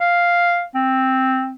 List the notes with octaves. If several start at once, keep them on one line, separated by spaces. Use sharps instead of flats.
F5
C4